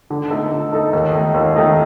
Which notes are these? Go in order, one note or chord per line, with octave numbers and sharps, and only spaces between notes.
D3
A3 D#4 A4
D3
A3 D#4 A4
D#2
D#3 A3 D#4
D#2
D#3 A3 D#4